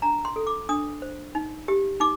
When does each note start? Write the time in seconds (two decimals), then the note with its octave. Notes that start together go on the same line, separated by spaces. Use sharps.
0.02 D4 A#5
0.25 C6
0.36 A4
0.47 D6
0.69 D4 D#6
1.02 C5
1.35 D#4
1.68 G4
2.00 D#4 D6